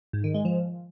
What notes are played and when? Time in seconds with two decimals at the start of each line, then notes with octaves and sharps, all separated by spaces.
0.13 G#2
0.24 D#3
0.34 G#3
0.45 F3